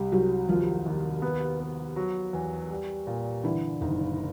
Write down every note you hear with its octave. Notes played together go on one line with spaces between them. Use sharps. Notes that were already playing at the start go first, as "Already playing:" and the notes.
Already playing: C2 G3 G4
C2 F#3 F#4
D#2 F3 F4
D#2
B3
B3
F#3
E2
G3
A#2
D3 E3 E4
F#1 D#3 D#4